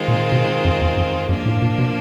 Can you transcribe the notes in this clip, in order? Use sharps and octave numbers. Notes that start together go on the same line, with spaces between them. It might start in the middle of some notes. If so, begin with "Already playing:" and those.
Already playing: D#3 G#3 C4 F4
A#2
B2
F2
E2
F2
F#2 F3 A#3 D4 F4
A2
A#2
B2